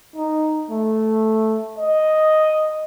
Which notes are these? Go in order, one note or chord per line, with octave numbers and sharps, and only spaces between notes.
D#4
A3
D#5